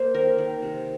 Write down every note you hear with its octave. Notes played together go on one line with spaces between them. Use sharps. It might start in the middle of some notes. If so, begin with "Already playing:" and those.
Already playing: A#3 C5
D#3 A#4
D#3
C3